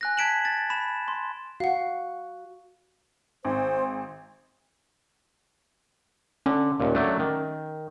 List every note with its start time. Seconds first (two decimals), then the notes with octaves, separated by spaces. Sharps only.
0.01 G#5 F#6 A#6
0.17 A5 G#6 B6 D7 E7 F#7
0.45 A6
0.70 B5 E7
1.08 C6
1.60 F#4 F5 F#5
3.45 G#1 C5
6.46 D3 C#4
6.80 D#2 A#2
6.95 F#3 A3 D4
7.19 D#3